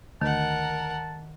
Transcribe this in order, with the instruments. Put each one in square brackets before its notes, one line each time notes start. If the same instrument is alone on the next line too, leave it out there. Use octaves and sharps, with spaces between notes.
[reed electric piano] D2 [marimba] D#3 [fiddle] A#4 F#5 [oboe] A5